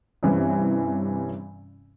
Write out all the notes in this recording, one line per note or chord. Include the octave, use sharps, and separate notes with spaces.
G2 C3 E3 C#4 E4